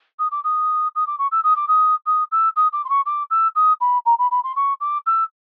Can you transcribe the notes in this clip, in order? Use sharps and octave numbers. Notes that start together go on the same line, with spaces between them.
D#6
D6
D#6
D#6
D6
C#6
E6
D#6
D6
D#6
D#6
E6
D#6
D6
C6
C#6
D6
E6
D#6
B5
A#5
B5
B5
C6
C#6
D6
E6